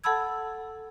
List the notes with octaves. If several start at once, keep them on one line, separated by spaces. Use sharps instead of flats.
A4 F#5 A5 B5 E6 G#6